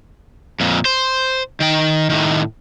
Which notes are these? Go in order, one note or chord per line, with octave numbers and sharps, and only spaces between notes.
F2 A#2
C5
D#3 G5
A2 D#3